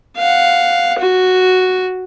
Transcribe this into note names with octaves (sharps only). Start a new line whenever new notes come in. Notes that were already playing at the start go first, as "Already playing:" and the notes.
F5 F#5
F#4